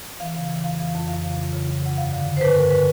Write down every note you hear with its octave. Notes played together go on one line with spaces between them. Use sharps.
E3 F5
C#3
E3
F2 F5
E3
F2
F2 F5
C#3
F2
C#3
F2
C#3 F#5
G2 F5
D3
D3
C5
G2 B4
G2 A#4
D3 B4